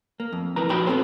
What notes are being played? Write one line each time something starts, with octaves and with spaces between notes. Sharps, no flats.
A#3
F2
F2 E3 A#4 B4 A#5
A#2 F3 D#4 F#4 G5 B5
B3 C4 A4 C5